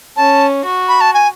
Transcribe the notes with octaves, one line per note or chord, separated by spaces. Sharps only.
C#4 A5
F#4
B5
A5
G#5